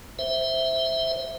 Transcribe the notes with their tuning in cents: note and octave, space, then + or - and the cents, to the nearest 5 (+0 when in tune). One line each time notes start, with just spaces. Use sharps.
C5 +0 E5 -5